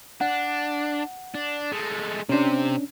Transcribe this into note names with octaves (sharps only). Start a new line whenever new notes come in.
D4 F#5
D4
G#3 A3
C3 C#4 D4 C5